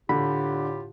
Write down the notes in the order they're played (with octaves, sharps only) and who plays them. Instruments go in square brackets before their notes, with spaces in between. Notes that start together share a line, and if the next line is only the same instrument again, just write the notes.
[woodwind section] A2 F4 G4 [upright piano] D3 [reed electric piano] B5